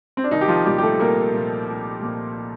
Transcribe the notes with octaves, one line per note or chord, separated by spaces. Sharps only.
C4
D4
C2 D#3 D#4
G4
F3 F4
A#2 F3 G3 G4
G4
A3 A4
C2 A#3 A#4
A#2 F3
C2
A#2 F3